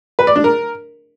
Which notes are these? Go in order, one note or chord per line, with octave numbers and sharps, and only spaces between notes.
B4
D5
D4
A#4